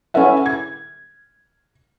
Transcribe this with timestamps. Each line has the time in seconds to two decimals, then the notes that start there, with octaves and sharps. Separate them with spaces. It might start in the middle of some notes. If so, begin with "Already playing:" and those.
0.14 C#4 E4 A4 B4 E5 F#5
0.46 G#6